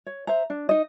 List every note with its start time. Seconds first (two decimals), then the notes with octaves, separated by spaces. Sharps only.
0.06 C#5
0.27 C5 E5 A#5
0.50 D4
0.69 D#4 D#5